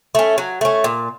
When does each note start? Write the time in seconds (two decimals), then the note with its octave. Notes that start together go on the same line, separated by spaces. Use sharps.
0.15 A3 C#4
0.38 F#3
0.61 A3 C#4
0.84 A#2